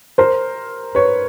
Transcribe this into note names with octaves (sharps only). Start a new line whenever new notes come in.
A#4 C5
B4 C#5